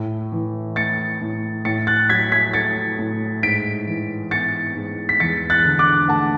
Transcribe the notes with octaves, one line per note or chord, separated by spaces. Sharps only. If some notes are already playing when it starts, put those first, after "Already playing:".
Already playing: A2
E3
A3 A6 C#7
A2
A2 A6 C#7
F#6 A6
F#3 G#6 B6
G#6 B6
A3 A6 C#7
A2
G#2 B6 D7
E3
B3 A6 C#7
G#2
B6
E2 A6 C#7
F#6 A6
D3
D6 F#6
A3 F#5 A5